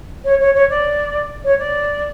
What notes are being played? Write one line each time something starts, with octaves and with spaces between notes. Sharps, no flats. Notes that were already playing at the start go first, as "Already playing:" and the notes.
C#5
C#5
C#5
D5
C#5
D5